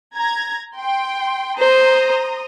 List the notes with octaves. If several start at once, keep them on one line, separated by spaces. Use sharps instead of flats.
A#5 G#6
G5 C6
C5 A#5 C6 D#6